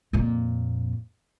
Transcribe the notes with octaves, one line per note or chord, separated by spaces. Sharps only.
F2 A#2